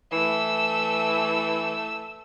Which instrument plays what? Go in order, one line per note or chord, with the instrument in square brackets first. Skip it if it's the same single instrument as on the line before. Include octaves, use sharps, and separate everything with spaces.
[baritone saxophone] E3 [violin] A3 E6